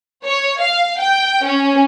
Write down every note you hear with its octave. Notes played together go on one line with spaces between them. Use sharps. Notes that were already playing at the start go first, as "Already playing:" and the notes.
C#5
F5
G5
C#4